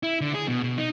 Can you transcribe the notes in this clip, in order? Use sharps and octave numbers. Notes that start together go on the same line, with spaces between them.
E4
D3
G#4
B2
B2
D#4